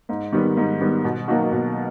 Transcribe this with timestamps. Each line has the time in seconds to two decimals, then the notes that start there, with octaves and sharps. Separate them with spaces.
0.09 G#2
0.32 D#3 G3 B3
0.57 G#2
0.80 D#3 G3 B3
1.04 B2
1.28 F#3 A#3 D#4 F#4
1.52 B2